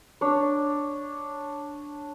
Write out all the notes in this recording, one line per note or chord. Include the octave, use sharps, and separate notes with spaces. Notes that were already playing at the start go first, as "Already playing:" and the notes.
D4 C#5